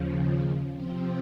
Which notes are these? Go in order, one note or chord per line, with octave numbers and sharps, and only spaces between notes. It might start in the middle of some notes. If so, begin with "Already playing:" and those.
Already playing: D#2 C#3 F3
C3 F3 C4 C5